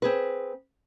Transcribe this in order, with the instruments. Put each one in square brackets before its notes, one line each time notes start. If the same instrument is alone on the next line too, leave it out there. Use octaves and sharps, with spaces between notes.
[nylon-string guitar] C4 G#4 B4